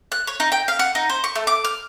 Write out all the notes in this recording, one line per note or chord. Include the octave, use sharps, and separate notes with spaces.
F#6
C#5
D#4
G5
F5
F#5
D#4
C5
C#6
A3
D6
F6